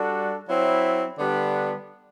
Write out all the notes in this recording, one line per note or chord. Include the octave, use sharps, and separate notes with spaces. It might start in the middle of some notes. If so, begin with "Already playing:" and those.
Already playing: G3 D4 F#4 A4
F#3 C4 E4
D3 G3 B3 D4